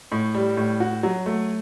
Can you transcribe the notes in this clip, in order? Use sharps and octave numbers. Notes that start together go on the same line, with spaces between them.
A2
G3
A2
F#4
F#3
A3